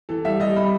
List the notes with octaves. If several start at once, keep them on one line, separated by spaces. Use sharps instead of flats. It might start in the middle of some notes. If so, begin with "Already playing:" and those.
E3 A4
G3 E5
G3 D#5
G3 B5